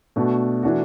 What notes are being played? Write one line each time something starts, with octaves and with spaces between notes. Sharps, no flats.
B2 A3 D4 F#4
E3 A3 D4 F#4